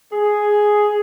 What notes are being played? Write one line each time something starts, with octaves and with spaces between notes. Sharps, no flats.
G#4